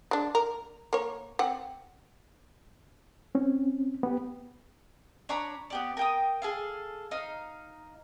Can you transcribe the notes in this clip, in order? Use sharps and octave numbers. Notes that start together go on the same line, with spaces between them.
G#3 D4
A#4
A#3 C#5
C4 F#5
C4 C#4
B3 G4
D4 C#5 A#5 B5
B3 G4 D5
A#4 G5 D#6
G#4 A4 F5
D#4 F5